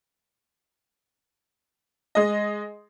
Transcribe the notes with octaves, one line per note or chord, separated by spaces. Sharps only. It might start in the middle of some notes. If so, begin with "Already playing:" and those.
G#3 D#5